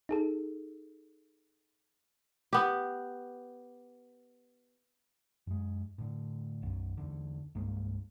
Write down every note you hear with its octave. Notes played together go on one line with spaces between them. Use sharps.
D#4 G#4 A4
B3 G4
F#2 G#3
A2 D3
B1 F#2
E2 D3
C2 G2 G#3 A#3